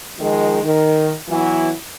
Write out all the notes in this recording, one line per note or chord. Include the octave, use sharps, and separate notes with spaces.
D#3 F3 G#3
D#3
E3 F#3 B3 E4